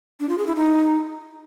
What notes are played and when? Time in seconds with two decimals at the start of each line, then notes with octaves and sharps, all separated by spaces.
0.20 D4
0.29 F4
0.38 G#4
0.47 E4
0.56 D#4